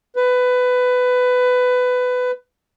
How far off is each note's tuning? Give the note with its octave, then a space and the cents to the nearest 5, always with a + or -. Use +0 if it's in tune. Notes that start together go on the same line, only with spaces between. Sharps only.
B4 +15